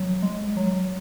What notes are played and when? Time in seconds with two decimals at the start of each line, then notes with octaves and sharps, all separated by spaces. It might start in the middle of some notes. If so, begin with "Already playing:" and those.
Already playing: F#3
0.22 G#3
0.57 F#3